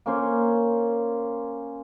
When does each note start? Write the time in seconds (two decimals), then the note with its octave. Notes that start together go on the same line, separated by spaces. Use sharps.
0.06 A#3 C#4 C5